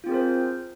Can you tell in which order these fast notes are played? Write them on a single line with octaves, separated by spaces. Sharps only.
F4 C4 G#4 A#4 C5